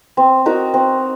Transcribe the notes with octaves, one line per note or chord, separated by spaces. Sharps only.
C4
D#4 F#4 A#4
C4